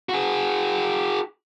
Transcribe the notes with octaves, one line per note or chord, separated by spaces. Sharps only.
F#4 G#4